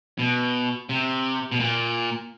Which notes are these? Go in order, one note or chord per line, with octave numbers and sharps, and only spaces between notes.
B2
C3
B2
A#2